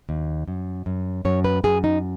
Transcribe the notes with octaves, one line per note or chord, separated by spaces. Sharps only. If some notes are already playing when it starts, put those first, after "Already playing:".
D#2
F#2
F#2
F#2 C#5
B4
F#2 G#4
D#4